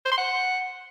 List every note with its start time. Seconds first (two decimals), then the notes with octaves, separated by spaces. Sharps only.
0.05 C5
0.11 C6
0.18 F#5